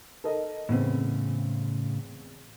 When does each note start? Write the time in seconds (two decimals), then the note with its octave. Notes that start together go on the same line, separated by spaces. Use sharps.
0.24 A4 A#4 D#5
0.69 E2 A2 C#3 B3 C4